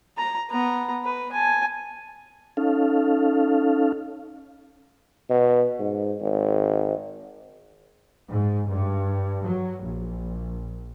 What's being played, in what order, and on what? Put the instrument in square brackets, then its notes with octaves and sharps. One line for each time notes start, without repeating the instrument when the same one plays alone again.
[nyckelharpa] A#5
B3 A#5
B4
G#5 A5
[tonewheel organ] C#4 D#4 A4 F5
[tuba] B2
G#2
G#1
[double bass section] G#2
G2
F#3
A#1